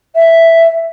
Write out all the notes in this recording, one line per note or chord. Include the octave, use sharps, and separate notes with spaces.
E5